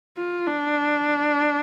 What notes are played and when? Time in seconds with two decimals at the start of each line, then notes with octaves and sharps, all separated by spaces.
0.18 F4
0.47 D4